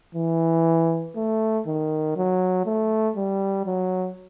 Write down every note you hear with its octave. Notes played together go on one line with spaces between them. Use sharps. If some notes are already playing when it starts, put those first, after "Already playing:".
E3
A3
D#3
F#3
A3
G3
F#3